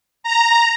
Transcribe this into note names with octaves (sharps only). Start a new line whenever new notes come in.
A#5